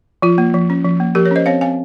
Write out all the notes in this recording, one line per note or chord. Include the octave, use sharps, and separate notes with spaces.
F3 F4
A#3
F3
C#4
F3
A#3
F3 G4 A#4
A#4 C#5
C#4 C5 D#5
C4 C#5 F5
C4 F5 G#5